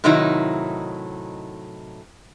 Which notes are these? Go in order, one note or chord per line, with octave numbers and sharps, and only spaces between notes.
A2 C3 D#3 F#3 D#4 E4